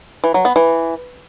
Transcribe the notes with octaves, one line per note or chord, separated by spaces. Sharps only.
E3
F#3
B3
E3